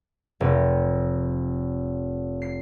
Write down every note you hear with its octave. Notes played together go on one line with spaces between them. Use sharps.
F1
C7